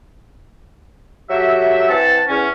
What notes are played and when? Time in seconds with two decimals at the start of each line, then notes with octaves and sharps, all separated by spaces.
1.29 F#3 A3 G4 E5
1.89 E3 C4 F#5 A5
2.28 E2 C#4